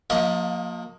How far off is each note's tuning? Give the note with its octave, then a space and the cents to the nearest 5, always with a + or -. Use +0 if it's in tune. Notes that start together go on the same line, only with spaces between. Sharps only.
F3 +35 A#3 +0 D#5 +30